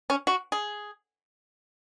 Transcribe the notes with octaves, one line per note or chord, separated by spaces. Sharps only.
C#4
F#4
G#4